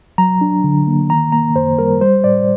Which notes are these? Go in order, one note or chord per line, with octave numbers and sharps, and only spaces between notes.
F#3 A#5
D4
D3
A#3
D#3 A#5
A#3 A#5
F#2 C5
G3 A#4
G3 C5
A2 D5